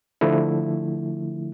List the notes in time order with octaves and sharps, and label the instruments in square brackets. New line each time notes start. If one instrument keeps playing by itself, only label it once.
[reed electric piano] D3 F3 A3 E4